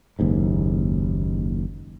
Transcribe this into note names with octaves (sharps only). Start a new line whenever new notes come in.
F#1 D#2 G#2